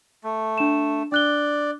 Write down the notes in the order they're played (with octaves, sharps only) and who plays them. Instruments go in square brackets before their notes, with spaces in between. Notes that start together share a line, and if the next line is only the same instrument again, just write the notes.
[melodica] A3
[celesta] D4 E7
[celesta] D4 F#6 G7 [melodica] D5